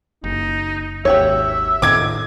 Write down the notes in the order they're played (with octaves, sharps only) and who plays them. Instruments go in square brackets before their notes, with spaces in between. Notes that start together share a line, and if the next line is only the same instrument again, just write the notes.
[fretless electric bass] F#1 [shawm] D#4
[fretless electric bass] G#1 D#2 [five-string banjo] F#4 G4 C#5 [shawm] E5
[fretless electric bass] A2 D#3 B3 [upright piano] D6 G#6